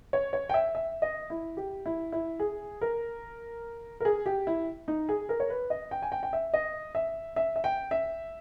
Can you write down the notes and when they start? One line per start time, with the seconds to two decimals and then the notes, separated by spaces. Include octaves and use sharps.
0.13 C#5
0.33 C#5
0.49 G5
0.54 E5
0.75 E5
1.02 D#5
1.30 E4
1.57 G4
1.86 E4
2.12 E4
2.40 G#4
2.81 A#4
4.00 A#4
4.05 G#4
4.26 G4
4.47 E4
4.88 D#4
5.09 G#4
5.29 A#4
5.40 C#5
5.50 B4
5.70 D#5
5.91 G5
6.02 G#5
6.12 G5
6.23 G5
6.33 E5
6.54 D#5
6.95 E5
7.36 E5
7.56 E5
7.64 G5
7.91 E5